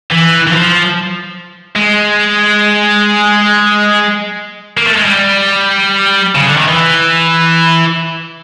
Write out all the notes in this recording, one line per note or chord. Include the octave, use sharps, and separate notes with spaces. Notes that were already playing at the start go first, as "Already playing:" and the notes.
E3
E3
F3
G#3
A#3
A3
G#3
G3
C#3
D3
D#3
E3